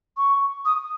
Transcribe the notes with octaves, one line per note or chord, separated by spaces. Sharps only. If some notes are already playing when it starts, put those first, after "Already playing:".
C#6
D#6